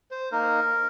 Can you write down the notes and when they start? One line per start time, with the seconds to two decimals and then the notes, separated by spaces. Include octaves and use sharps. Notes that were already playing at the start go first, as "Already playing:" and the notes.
0.11 C5
0.32 A#3 D#4 A#4